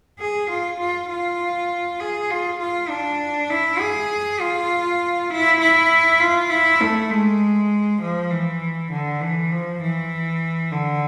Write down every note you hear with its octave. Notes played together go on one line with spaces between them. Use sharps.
G#4
F4
F4
F4
G#4
F4
F4
D4
E4
G#4
F4
E4
E4
F4
E4
A3
G#3
F3
E3
D3
E3
F3
E3
D3